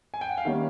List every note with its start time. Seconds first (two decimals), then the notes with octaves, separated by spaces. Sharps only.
0.14 G#5
0.21 G5
0.29 F#5
0.38 F5
0.45 D#3 G3 A#3 C#4 E5